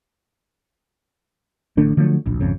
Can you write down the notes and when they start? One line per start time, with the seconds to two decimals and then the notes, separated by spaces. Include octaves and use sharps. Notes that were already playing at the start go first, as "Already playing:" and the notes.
1.77 A1 D3 A3 D4
1.97 D3 F3 F#3 A3
2.26 D1 A#1
2.40 G#1 F2 C#3